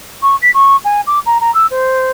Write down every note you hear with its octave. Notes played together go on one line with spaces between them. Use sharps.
C#6
B6
C#6
G#5
D6
A#5
A#5
E6
C5